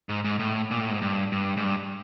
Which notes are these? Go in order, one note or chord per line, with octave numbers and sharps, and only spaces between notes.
G#2
G#2
A2
A#2
A2
G#2
G2
G2
G#2
G2